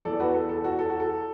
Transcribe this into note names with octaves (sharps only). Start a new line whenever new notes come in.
E2 E3 A4 D5
F#4 B4
A4
A4
F#4
A4
F#4
A4